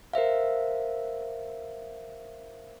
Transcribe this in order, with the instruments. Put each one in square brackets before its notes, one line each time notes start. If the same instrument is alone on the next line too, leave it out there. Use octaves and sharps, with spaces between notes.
[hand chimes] A#4 C5 E5 F5